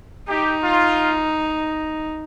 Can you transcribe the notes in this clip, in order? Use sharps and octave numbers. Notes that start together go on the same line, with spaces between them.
D#4 G4
F4